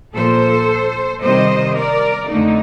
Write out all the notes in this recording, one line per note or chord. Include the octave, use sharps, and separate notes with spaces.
A#2 F3 A#3 A4 C5
C3 D#3 G3 C5 D#5
A#4 D5
F2 D3 A3 D#4